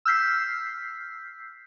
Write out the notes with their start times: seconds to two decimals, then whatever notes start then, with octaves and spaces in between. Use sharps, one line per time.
0.05 E6 F6 G6 B6 C7